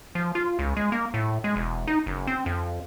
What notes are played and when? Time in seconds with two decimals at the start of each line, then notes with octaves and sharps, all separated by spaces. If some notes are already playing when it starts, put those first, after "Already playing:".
0.15 F3
0.35 F4
0.59 C#2
0.77 G#3
0.92 A#3
1.14 A2
1.44 G#3
1.56 E1
1.87 D#4
2.06 F#1
2.27 C4
2.46 F2